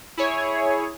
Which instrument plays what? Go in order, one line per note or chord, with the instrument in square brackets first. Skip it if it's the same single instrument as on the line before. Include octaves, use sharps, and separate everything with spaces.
[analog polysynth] E4 G#4 C#5